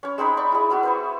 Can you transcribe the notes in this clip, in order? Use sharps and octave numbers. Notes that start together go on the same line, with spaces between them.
C#4 C#5
G#3 C4 D#4 B5
D5 B5 C#6
E4 G#4
C4 E4 F#4
B4 C5 C#6